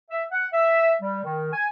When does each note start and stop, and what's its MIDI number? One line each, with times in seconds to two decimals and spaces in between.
0.11 0.24 76
0.32 0.47 78
0.53 0.94 76
1.02 1.21 55
1.24 1.52 51
1.53 1.67 80